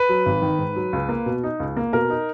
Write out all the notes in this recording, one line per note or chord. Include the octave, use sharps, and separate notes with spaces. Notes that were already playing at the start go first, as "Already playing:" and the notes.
Already playing: B4
F#3
G#1
D#3
G#2
F#3
C#2
A#3
B2
D#4
C#2
A#3
B2 A#4
D#4